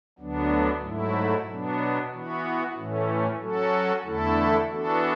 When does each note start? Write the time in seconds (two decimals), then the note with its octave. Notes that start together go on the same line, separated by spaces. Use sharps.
0.19 D2 D3 F#3 B3 D4
0.83 G#2 F#3 A3 E4
1.47 B2 F#3 B3 D4
2.12 E3 B3 F#4
2.76 A2 E3 A3 C#4
3.40 F#3 C#4 F#4 A4
4.04 E2 D3 A3 E4 A4
4.69 E3 B3 D4 F#4 A4